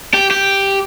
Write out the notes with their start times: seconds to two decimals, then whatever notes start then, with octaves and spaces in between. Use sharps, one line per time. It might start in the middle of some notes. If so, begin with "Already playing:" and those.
0.14 G4
0.31 G4